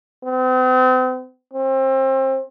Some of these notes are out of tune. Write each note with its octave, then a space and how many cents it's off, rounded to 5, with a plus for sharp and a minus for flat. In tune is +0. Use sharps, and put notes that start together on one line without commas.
C4 -40
C4 +30